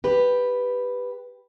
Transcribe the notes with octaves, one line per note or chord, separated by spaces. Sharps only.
G4 B4